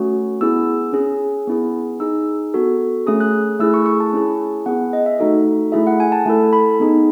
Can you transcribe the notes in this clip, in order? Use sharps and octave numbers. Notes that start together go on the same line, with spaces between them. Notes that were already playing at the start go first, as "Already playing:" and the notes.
Already playing: A3 C#4 F#4
B3 E4 G#4 E6
C#4 G#4
B3 E4 G#4
D#4 G#4 E6
B3 F#4 A4
A3 C#4 G#4 D#6
F#6
A3 E4 G#4 E6
C#6
C#6
A5
C#4 E4 G#4
B3 E4 G#4 F#5
D#5
E5
A3 D#4 F#4 A4
A3 E4 G#4 E5
F#5
G#5
A5
A3 E4 A4
B5
B3 D#4 G#4